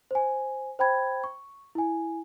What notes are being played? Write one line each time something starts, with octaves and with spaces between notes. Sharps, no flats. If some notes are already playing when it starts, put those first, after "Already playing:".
C5 G#5
C5 G5 B5 G#6
C#6
E4 G#5